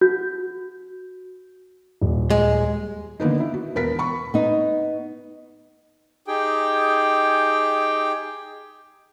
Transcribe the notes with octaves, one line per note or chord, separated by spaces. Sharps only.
F#4 G6
D#1
G#3
D3 D#3 A#3 B3 D#4
E4
F#4
E1 B3 A#4 B6
B5 C#6
B3 D#4
D#4 G4 G#4 G5